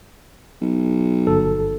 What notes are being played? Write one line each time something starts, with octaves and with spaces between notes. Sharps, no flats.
B1
G1 A4